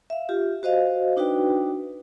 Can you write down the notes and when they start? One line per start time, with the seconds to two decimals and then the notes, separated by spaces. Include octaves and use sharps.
0.10 E5 F5
0.29 F4 G4
0.63 F#4 C5 D#5 F5
1.17 D4 D#4 F#4 B4 D5 G5